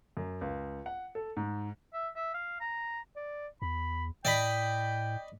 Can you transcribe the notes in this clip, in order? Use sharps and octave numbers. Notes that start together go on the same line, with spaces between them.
F#2
C#2
F#5
A4
G#2
E5
E5
F5
A#5
D5
E2 B5
A2 D5 D#5 G5 B5